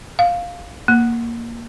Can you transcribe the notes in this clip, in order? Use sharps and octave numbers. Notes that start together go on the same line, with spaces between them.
F5
A#3